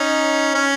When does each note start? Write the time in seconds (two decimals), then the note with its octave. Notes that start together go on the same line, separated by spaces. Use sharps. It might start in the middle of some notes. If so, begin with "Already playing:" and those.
Already playing: C#4 D#4
0.55 C#4